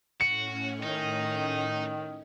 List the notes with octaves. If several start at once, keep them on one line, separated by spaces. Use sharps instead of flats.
A2 C#4 F#4 C#7
D#3 D#4